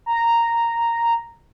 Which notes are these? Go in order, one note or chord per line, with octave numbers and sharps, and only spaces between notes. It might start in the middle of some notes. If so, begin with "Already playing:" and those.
A#5